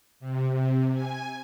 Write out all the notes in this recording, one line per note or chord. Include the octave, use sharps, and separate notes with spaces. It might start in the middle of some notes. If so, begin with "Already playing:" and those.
C3
C3
G#5